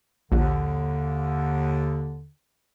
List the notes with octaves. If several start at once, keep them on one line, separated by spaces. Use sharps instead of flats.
A#1 D#2 D3